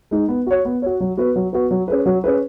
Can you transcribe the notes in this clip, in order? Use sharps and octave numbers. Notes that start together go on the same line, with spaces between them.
G#3 D#4
B3
F#4 C#5
B3
F#4 C#5
F#3
B3 F#4 B4
F#3
B3 F#4 B4
F#3
C#4 G#4 B4
F#3
C#4 G#4 B4